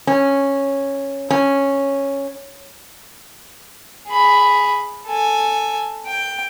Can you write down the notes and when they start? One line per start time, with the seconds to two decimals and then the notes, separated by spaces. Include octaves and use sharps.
0.07 C#4
1.30 C#4
4.08 G#4 B5
5.06 A4 G#5
6.06 G5